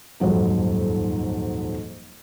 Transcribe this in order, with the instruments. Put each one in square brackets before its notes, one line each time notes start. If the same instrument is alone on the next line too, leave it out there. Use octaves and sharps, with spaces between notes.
[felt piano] D#1 F2 G#2 F#3 D#4